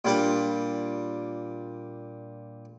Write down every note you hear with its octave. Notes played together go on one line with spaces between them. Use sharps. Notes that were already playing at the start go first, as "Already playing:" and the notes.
A#2 G3 D4